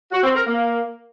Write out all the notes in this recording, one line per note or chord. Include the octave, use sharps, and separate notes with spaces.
F#4
C4
A#4
A#3